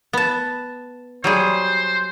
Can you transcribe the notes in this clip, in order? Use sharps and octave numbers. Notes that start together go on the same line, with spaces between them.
B3 A5
F#3 G3 G#4 C5